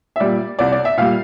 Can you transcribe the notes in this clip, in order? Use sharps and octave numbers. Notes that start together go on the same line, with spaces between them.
E5
A#2 G3 D5
C2 D5
D5
E5
A#2 G3 F5